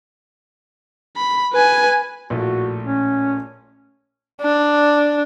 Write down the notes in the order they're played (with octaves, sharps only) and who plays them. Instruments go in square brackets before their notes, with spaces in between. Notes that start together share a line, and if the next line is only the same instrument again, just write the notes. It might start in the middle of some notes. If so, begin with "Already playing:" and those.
[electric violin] B5
B4 G#5
[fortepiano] A#1 A2 A3 [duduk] F#4
[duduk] C#4
[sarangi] D4